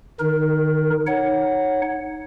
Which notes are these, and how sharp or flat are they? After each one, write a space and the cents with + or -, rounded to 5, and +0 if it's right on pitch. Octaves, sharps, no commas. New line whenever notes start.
D#3 -30 D#4 +0 A#4 +15
D#4 +0 C#5 -5 F#5 +0